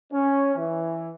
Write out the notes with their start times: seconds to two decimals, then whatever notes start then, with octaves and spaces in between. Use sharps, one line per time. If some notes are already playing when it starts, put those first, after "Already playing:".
0.12 C#4
0.56 E3